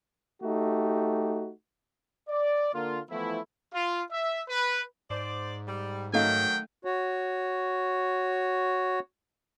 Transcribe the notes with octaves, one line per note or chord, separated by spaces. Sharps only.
A3 D#4 F#4 G4
D5
D3 A#3 F4
E3 F3 A3 B3 E4
F4
E5
B4
G#2 C5 D5
G3
D#3 F#3 A3 D#4 F5 G5
F#4 C#5